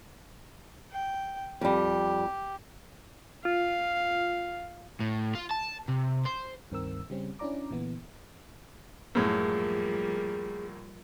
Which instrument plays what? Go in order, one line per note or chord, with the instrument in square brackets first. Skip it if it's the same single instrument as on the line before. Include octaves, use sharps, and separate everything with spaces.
[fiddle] G5
[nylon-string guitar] F2 G3 [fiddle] G4
[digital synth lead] F4 [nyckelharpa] F5
[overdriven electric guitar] A2
F4
A5
C3
C5
[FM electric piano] C#2 G2 D#3 C4 A#4 E6
C#3 G3 C4 C#4
C#4 D4 E4 D5 A#5 D6
A#2 D3 E3 B3
[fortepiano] F#2 A2 [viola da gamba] F3 G3 A#3 [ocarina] G#4